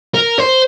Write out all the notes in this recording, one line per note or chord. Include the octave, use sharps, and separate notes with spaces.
A#4
C5